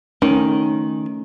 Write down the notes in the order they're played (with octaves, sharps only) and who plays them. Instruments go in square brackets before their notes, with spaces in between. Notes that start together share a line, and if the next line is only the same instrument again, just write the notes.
[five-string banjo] D#3 [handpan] A3 C#4